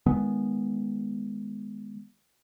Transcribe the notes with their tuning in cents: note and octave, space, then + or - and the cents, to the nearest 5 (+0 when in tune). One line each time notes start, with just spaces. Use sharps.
D#3 +0 G#3 +0 B3 +0